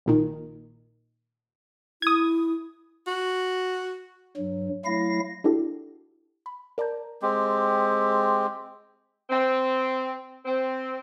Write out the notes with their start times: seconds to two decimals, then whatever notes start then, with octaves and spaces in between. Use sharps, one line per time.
0.06 A#1 A#2 D#3
2.02 E4 D#6 G#6
3.07 F#4
4.37 G2 F#3
4.85 F#3 A3 E4 F5 A#6
5.44 D4 E4 F#4 G4 A4
6.46 B5
6.78 A#4 D5 A5 A#5 G6
7.22 G#3 C4 G4
9.30 C4
10.45 C4